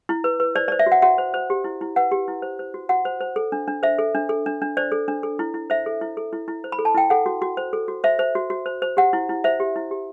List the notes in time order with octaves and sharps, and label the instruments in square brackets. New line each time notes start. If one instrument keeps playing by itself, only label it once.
[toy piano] E4
B4
B4
C5 D5
C5 D5
E5
F#4
F#5
F#4 F#5
C5
C5
G4
E4
E4
B4 F#5
G4
E4
C5
C5
F#4
F#4 F#5
C5
C5
A4
D4
D4
C5 E5
A4
D4
A4
D4
D4
C5 D5
A4
D4
A4
E4
E4
C5 E5
A4
E4
A4
E4
E4
C5
B5
A4
A5
E4 G5
A4 F#5
F#4
F#4
C5
A4
F#4
C5 E5
C5
F#4
F#4
C5
C5
G4 F#5
E4
E4
C5 E5
G4
E4
G4